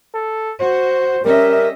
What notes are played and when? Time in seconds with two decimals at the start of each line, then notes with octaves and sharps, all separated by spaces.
0.14 A4
0.60 F#4 C5
1.24 G3 C#4 A#4 D#5 E5